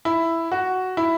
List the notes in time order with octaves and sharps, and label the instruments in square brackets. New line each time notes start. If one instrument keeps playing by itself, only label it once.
[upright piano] E4
F#4
E4